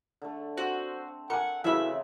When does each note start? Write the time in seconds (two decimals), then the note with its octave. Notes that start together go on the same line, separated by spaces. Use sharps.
0.22 D3 A3
0.57 C4 F#4 C5
1.30 A#4 F#5 G#5 C#6
1.64 C#3 E3 A3 C4 E4 F#4 E5 B5